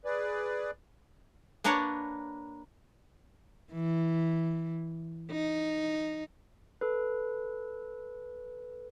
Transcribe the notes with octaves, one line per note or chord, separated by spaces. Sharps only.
G#4 B4 D5
A#3 D4 A#4 B4 C#5 F#5
E3
D#4
A4 B4